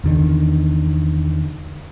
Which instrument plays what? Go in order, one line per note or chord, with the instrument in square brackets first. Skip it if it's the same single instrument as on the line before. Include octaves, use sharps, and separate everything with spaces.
[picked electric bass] E2 D3 D#3